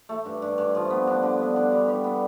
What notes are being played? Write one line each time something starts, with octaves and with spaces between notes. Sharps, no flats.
A3
G2
G2
G2
F3
B3
D4
D3
B3
D4
G3
G3
B3